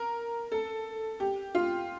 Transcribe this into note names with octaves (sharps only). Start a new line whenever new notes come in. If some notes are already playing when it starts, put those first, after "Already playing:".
Already playing: A#4
A4
G4
F4